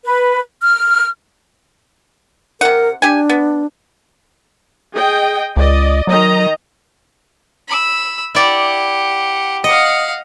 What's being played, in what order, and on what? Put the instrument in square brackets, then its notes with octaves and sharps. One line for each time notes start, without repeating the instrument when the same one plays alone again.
[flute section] B4
F6
[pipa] C3 F#5 [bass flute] A#4
[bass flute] D4 [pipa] G4 G#5
[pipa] B3
[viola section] G#4 D#5 G5
[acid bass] C#2 [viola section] D5 D#5
[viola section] D#3 D#5 A#5 [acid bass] F#3
[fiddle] B5 E6
[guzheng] E4 D5 [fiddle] G4 F#5
[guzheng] D#5 [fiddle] F5 F#5